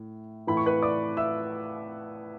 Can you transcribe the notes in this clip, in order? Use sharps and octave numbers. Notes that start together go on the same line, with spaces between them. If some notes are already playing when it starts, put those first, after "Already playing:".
Already playing: A2
A2 E3 B5
C#6
B4 B5
D5 D6
E5 E6